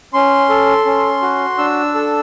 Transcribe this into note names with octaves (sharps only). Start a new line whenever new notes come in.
C#4 C6
A4
C#4
F#4
D4 E6
A4